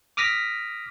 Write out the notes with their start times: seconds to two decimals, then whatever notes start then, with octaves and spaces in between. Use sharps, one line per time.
0.17 D6 D#6 F6 A#6 B6